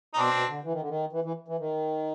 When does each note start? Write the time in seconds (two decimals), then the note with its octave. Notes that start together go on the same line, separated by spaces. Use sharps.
0.14 D#4
0.17 B2 C4 D4
0.33 B2
0.49 D3
0.65 E3
0.73 D#3
0.81 D3
0.89 D#3
1.13 E3
1.24 E3
1.48 E3
1.60 D#3